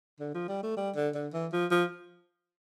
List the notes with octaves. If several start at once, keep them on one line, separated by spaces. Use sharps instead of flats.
D3
F3
G3
A3
G3
D3
D3
E3
F3
F3